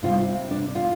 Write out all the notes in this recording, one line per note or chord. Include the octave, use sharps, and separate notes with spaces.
C3 G3 C4 F4
D4
F4